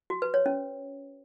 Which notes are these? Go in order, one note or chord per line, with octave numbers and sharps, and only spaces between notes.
F#4
B4
C#5
C#4